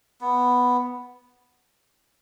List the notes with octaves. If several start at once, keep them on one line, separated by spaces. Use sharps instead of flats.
B3